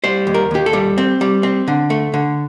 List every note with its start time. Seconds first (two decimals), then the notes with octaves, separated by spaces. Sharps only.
0.04 G3 C5
0.27 D#2
0.34 A#4
0.51 D#2 G4
0.66 A4
0.73 G3
0.98 C4
1.21 G3
1.43 C4
1.68 D3
1.90 A3
2.14 D3